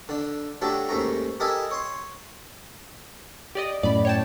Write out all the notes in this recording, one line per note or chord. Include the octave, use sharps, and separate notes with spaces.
D3 D4
F#3 A3 D4 G4 A4
D#2 G#2 A3 C#4 A#5
G4 A4 A#4 D#5 E5 G#5
C#5 C6
G4 D5 D#5
F#2 A2 D5 B5
C#5 G5 A5